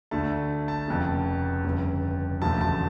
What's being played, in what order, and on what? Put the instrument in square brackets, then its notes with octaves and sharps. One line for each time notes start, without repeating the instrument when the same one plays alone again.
[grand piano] D2 D3 A3 A5
A5
F1 F2 C#3
G1 F2 C#3
E1 D2 C#3 F3 A3 A5
A5